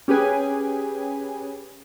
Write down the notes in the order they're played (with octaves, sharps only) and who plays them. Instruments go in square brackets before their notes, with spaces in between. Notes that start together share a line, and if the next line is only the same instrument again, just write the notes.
[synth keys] C#4 G4 G#4 B4 G#5